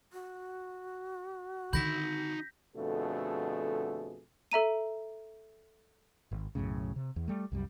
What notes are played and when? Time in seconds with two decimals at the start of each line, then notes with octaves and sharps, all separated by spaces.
0.13 F#4
1.73 D3 D#3 D#4 B5 G6 A#6 B6
2.76 F2 B2 D3 A3 G#4 A4
4.52 A4 E5 A#5 D#7
6.32 G#1
6.55 B1 F#2 A2 C#3
6.96 C3
7.16 E2
7.28 G3 A3
7.52 C2 F#2 G3